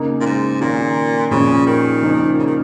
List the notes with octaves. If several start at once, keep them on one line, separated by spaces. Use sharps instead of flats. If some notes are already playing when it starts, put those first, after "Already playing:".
Already playing: C#3 A#3 D#4
A#2
G#2
A#2 D#3 C#4 F4
A#2 C#3 F3 C#4
D#3
C#3 F3 A#3 D#4
C#3
D#3